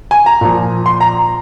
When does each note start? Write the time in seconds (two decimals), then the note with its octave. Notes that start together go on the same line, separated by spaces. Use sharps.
0.11 G#5
0.26 A#5
0.41 A#2 F3
0.86 C6
1.01 A#5